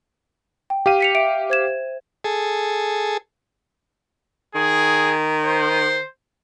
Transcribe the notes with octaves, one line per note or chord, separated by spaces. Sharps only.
G5
G4 F5 G5 D#7
B6 C#7 F7
E5 D7
C5 G#6 E7
G#4 A4
D#3 G#4
C5